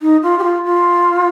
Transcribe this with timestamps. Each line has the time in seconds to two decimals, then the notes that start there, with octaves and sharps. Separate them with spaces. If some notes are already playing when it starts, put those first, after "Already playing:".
0.02 D#4
0.23 F4
0.39 G4
0.44 F4
0.65 F4